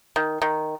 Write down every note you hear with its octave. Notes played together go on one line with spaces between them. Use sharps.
D#3
D#3